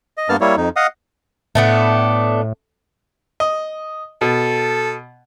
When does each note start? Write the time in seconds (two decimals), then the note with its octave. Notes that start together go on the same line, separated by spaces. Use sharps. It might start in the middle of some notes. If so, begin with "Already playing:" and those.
0.18 D#5
0.29 G2 A#3 B3 A5 F6
0.41 G3 A#3 E4 C#5
0.57 F2 D#4
0.76 D#5 F5 F#5 D#6
1.55 A2 A3 B3 D4
3.40 D#5
4.21 B2 A4